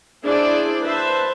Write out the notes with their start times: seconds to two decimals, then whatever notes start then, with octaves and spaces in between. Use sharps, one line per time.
0.24 D4 E4 G#4 C5 D5
0.84 B4 C5 E5 A5